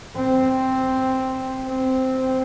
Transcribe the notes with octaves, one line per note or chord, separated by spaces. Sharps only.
C4
C4